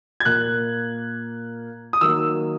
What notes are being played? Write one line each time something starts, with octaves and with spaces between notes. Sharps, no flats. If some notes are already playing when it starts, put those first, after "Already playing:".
G#6
A#2 A#3 F#6
D#6
D#3 F#3 A#3 E6